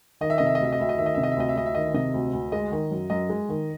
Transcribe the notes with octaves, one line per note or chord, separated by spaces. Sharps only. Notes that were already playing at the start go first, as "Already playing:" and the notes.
D#3 D#5
E5
C3 D#5
E5
D#5
D2 E5
D#5
D2 E5
D#5
D#3 E5
D#5
C3 E5
D#5
E5
D2 D#5
E5
D2 D#5
E5
D#3 D#5
C3 D#5
D2
D2
G#3 D#5
D#3
F#2
F#2 D#5
G#3
D#3